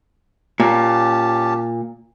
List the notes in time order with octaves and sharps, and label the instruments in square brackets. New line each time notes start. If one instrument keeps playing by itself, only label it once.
[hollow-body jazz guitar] A#2 [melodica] C#4 G4 A5